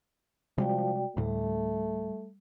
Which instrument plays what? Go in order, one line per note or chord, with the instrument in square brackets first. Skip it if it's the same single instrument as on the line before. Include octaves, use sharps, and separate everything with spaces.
[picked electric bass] C3 G3 G#3 [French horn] F3 [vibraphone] F#4 D5 G5
[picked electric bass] D2 A2 [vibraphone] G3 [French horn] A3